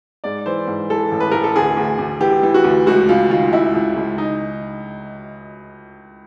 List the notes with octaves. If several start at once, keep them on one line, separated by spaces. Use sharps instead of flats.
G#2 D5
E3 C5
G#2
E3 A4
A1
B4
A1 A#4
A4
D2 G#4
D2
D2
E3 G4
E3
F#4
D2
C#2 F#4
C#2 F4
D#3 F4
C#2 E4
C#2
C#2
D#4